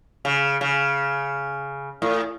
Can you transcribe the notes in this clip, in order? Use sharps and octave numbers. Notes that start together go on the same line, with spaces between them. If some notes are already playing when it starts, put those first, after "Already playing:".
C#3
C#3
A2